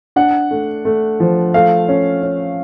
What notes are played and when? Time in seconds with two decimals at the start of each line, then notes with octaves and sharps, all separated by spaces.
0.16 D4 F#5
0.51 A3
0.85 A3
1.20 F3
1.54 A3 F5
1.89 C#4
2.23 C#4